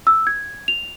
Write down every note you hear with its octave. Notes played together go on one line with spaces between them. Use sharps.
E6
G#6
F7